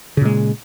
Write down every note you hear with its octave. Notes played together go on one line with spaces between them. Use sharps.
A#2 C#3 G#3